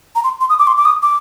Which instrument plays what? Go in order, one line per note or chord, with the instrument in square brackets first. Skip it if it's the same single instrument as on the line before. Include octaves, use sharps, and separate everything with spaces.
[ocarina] A#5
C6
C6
D#6
D6
C6
D6
D#6
D6